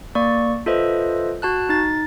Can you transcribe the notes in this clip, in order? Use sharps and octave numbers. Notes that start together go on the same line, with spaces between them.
A#3 D5 C#6
F4 A4 B4 C5 D#5 E5
F#4 A5 F#6
D#4 A6